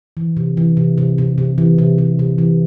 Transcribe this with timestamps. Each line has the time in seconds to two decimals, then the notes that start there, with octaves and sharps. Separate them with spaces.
0.17 E3
0.37 C3
0.57 E3
0.77 C3
0.98 C3
1.18 C3
1.38 C3
1.58 E3
1.78 C3
1.98 C3
2.19 C3
2.38 E3